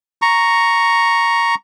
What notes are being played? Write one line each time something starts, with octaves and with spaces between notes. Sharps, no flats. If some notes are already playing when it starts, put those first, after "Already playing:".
A#5 C#6